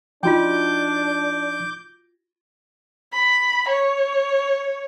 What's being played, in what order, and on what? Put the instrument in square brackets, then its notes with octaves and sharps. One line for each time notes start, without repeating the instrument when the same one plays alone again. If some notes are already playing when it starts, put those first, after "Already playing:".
[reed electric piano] F3 D#4 [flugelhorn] D4 [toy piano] F4 F#4 G5 [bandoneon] D6 G6
[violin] B5
C#5